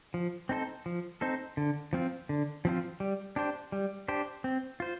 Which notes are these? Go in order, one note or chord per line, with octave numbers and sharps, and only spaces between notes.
F3
C4 D#4 A4 C5
F3
C4 D#4 A4 C5
D3
F3 C4 F4
D3
F3 C4 F4
G3
D4 G4 C5
G3
D4 G4 C5
C4
F4 C5